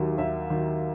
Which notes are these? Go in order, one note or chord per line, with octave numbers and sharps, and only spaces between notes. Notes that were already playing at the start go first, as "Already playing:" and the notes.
Already playing: D#2 D#3 F#3 E5
D#2 E5
D#3 F#3